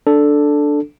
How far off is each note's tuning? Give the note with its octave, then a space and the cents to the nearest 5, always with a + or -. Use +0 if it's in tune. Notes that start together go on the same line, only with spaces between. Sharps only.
D4 +0 A4 +0